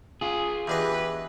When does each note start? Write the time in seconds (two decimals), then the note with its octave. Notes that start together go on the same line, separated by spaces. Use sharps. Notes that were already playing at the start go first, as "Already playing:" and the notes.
0.21 F4 G#4
0.67 E2 D4 G4 B4 D#5